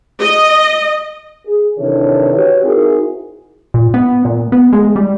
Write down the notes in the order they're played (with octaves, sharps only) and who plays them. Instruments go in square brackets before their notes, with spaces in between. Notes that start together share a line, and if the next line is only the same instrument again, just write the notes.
[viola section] D#5
[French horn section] G#4
C3 D#3 E3 D4 A4 C#5
F#4 G4 B4 C#5
C4 D#4 E4 F#4 G#4 A#4
[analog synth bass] A#2
B3
A#2
B3
G#3
G3